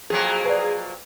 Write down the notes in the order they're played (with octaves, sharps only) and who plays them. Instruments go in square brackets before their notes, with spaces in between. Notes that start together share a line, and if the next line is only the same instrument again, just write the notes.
[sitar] F2 F#3 A#3 [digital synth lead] G#4
[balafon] B4 D5